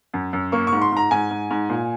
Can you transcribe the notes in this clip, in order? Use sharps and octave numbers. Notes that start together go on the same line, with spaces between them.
F#2
F#2
A#3 C#6
C#6
G#2
C6
G#2 A#5
G#2 G#5
G#2
G#2
A#2